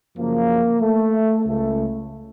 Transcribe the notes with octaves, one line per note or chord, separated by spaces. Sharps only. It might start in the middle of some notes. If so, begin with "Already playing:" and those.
F#2 C#3 F3 A#3
A3
C#2 C#3 A3